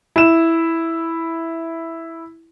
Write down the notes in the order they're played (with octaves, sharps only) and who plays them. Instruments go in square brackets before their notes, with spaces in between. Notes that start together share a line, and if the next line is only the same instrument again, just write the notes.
[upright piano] E4 E7